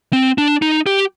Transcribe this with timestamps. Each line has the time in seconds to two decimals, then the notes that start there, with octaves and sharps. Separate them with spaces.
0.13 C4
0.38 D4
0.62 D#4
0.86 G4